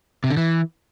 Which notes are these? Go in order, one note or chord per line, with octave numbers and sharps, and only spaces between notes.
C3
D3
E3